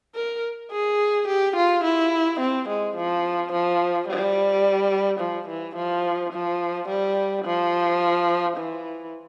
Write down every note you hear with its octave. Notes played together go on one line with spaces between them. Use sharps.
A#4
G#4
G4
F4
E4
C4
G#3
F3
F3
G3
F3
E3
F3
F3
G3
F3
E3